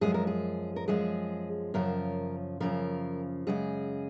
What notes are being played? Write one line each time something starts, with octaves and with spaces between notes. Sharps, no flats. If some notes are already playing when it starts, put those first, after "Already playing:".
F#2 F3 G#3 G#4
A#4
G#4
A#4
F#2 F3 G#3 G#4
F#2 C#3 F3 A#4
F#2 C#3 F3 A#4
F#2 C#3 G#3 G#4